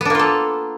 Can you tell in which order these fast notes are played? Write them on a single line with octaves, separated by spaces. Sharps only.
B3 D4 A#3 F4 A4